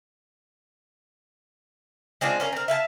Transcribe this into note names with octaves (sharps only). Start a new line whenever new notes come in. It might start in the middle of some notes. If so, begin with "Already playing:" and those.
G#3 C4 D4 F4
C#4 F4 A#4
C4 A#4
E5 F5 G#5 A5